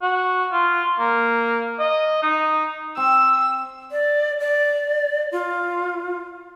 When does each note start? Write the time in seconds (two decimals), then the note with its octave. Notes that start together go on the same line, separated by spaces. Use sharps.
0.02 F#4
0.52 F4
0.99 A#3
1.79 D#5
2.23 D#4
2.97 C4 E6
3.91 D5
4.40 D5
5.32 F4